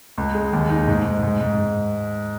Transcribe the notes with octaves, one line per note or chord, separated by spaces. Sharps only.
C#2
G#3
D#2
D#4
G#2
G#2
G#2
G#2